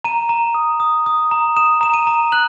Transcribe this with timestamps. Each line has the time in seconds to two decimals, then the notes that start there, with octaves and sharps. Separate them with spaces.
0.04 A#5 D#7
0.29 A#5
0.54 D#6
0.80 D#6
1.06 D#6
1.31 A#5
1.57 D#6 E7
1.81 A#5 E7
1.94 D#7
2.07 A#5
2.32 F#6 F#7